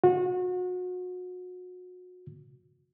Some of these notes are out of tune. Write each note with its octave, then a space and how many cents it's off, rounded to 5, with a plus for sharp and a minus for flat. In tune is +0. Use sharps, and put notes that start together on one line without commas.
F#4 -30